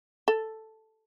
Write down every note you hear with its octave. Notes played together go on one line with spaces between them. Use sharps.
A4